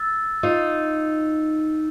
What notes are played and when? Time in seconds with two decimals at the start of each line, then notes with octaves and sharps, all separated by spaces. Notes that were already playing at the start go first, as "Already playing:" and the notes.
Already playing: E6 A6
0.43 D#4 F4